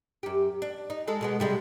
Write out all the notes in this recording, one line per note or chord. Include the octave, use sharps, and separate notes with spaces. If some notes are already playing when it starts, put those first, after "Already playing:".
F#2 G4
D4
D#4
G#3 A4
B2 G#3 B3
C3 G3 G#3